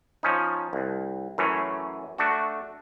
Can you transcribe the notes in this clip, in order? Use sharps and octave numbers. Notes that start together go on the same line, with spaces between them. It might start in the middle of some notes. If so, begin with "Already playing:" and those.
F3 C#4 D#4
C2
F#2 E3 A3 C#4
A3 D4 F#4